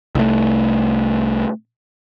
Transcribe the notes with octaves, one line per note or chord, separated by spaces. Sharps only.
C2 A3